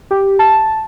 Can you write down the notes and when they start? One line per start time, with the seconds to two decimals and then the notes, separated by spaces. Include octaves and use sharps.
0.11 G4
0.39 A5